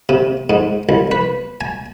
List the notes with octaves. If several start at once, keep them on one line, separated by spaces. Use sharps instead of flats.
C3
G#2
C2
B4
G#5